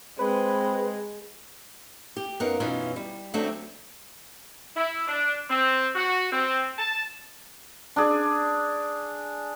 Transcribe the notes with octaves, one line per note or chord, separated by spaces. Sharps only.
G#3 C4 B4
G4
F#2 B3 D#4 A#4 F5
F#2 B2 E3 C#4 D#4 F4
G3
D2 F#3 A3 C4 D4 E5
E4
D4
C4
F#4
C4
A5
D4 G#4